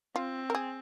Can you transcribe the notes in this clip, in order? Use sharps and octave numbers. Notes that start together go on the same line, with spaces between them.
C4 F4
A#4
G#4